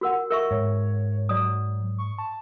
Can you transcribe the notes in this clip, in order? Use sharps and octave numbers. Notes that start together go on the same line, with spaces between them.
F#4 A#4 F#5
A#4 E5 C#6
G#2 C#5
F#3 D5 D#6
C#6
A5